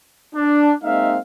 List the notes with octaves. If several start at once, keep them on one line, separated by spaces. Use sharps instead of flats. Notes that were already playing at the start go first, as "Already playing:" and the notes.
D4
G#3 A#3 C4 D#4 E5 F5